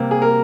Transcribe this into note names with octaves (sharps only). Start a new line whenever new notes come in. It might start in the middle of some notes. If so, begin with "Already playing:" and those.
Already playing: C3 G3 A#3
G#4
A#4